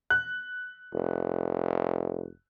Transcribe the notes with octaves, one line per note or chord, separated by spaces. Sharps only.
F#6
F1